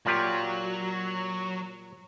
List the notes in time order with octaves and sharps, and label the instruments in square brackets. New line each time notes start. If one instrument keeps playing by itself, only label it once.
[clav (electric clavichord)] A#2 F4 G4 [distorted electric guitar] F#3